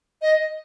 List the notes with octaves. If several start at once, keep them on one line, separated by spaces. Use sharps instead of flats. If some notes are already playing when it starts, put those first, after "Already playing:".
D#5